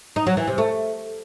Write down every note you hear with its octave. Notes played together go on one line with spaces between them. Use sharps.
D#4
F#3
E3
C3
A3